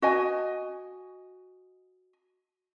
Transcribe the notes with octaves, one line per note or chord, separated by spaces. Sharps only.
F#4 D#5 G#5